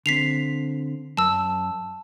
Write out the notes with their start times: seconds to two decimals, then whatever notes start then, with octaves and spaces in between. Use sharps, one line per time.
0.06 D3 C4 B6 C7 F7
1.17 F#2 A5 E6